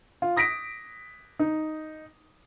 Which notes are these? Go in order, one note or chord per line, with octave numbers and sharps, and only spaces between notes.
F4
D#6 A#6 B6 D7
D#4